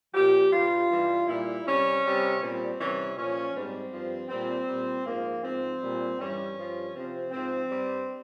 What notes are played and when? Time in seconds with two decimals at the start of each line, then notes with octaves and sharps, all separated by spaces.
0.14 A#2 F3 G4
0.52 G2 G3 F4
0.90 G2 E3 G3
1.27 A#2 G3 E4
1.65 C3 G3 C#4
2.03 C3 G3
2.41 A#2 G3 C4
2.79 C3 E3 G3 C#4
3.17 A#2 F3 C#4
3.54 G#2 G3 C4
3.92 G2 F3
4.30 A#2 G3 C4
4.68 A#2 G3
5.05 G#2 F3 A#3
5.43 G#2 F3 C4
5.81 A#2 G3
6.19 G2 E3 G3 C#4
6.57 G2 F3
6.94 C3 F3 C4
7.32 G#2 F3 C4
7.70 G2 G3